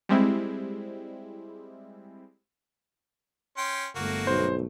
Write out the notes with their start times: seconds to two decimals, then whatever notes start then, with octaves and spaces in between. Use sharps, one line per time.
0.09 G3 G#3 C4 E4
3.57 C#4 G5 C6
3.96 G1 A3 A#3 F#4
4.27 B1 C5